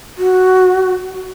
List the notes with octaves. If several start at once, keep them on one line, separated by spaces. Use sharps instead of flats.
F#4